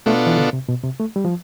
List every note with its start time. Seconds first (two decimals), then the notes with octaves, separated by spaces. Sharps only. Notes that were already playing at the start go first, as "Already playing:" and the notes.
0.06 B2 A3 B3 D4 F4 A4
0.27 E3
0.38 D3
0.53 C3
0.69 B2
0.84 C3
1.00 A3
1.16 G3
1.25 F3